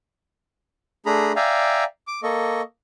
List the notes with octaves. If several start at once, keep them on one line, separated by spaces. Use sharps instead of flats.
A3 D4 G#4 A#5 B5
D5 E5 F5 G5 G#5 A#5
D6
A#3 A4 D#5 C#6